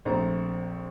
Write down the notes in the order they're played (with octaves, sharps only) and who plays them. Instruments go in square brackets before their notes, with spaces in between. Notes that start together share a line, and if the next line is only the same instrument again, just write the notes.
[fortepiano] A#1 A3 C4 A4 A#5